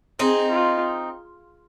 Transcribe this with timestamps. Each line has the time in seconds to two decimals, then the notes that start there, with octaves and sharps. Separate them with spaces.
0.19 C4 D#4 G#4
0.51 F4